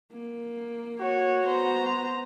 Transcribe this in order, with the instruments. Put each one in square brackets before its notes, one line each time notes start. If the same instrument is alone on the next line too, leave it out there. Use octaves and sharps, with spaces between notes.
[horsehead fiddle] A#3
[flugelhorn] F#4 [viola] C#5
[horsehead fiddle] B3 [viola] C5 A#5